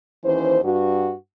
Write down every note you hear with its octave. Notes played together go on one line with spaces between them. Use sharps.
D#2 E3 C#4 C5
G2 F#4